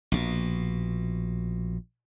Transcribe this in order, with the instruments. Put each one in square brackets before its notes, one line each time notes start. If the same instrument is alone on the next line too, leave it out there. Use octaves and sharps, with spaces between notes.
[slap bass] A#1 B2